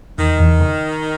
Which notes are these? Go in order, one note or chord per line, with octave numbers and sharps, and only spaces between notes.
E2 D#3
E2